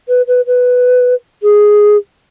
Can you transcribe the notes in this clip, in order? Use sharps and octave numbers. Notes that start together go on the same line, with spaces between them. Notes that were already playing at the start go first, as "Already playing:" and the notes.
B4
B4
B4
G#4